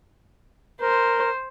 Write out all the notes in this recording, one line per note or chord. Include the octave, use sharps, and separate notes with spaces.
A#4 C5